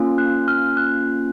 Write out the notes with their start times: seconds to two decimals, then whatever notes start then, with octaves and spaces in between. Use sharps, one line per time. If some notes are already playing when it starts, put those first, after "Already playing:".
Already playing: A#3 C#4 F4
0.18 F#6
0.48 F6
0.77 F#6